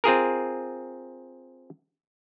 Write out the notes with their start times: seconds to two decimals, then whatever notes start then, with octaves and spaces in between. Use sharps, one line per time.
0.04 C4 F4 G#4 A#4